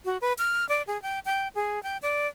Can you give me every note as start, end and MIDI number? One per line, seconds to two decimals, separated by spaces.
0.05 0.18 66
0.21 0.33 71
0.38 0.67 89
0.69 0.82 74
0.87 1.00 68
1.02 1.19 79
1.25 1.48 79
1.55 1.82 68
1.83 1.97 79
2.02 2.27 74